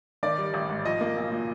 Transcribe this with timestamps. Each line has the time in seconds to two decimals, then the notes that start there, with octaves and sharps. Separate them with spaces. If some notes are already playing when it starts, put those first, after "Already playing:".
0.23 D#3 D5
0.38 G3
0.54 A1
0.69 G#2
0.85 F3 D#5
1.01 A#3
1.17 B1
1.32 A#2